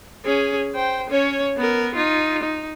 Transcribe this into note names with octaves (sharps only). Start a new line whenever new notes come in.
C#4 G#4
C5 G5
C#4 C#5
B3 A#4
D#4 F4
D#4